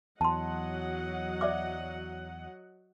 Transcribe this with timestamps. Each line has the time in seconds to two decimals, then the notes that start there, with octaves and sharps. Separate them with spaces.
0.21 E2 F#3 D#5 F#5 A5 C6
1.41 D5 E5 D6